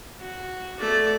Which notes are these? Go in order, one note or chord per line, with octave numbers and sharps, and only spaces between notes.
F#4
A3 D5